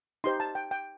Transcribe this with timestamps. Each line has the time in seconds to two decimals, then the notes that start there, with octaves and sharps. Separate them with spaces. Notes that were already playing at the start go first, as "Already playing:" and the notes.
0.24 D#4 G4 C5 C6
0.40 A5
0.55 G5
0.71 G5